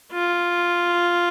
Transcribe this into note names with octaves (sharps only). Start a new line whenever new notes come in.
F4